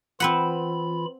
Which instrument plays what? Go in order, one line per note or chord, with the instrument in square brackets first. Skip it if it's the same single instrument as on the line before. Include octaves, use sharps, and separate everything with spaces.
[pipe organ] E3 F4 B5 [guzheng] C4 B4 F#5